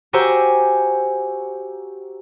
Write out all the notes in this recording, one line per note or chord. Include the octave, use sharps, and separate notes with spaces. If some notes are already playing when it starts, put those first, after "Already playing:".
F#4 G4 C5 G#5 A#5 E6